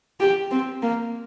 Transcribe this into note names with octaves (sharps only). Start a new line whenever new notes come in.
G4
C4
A#3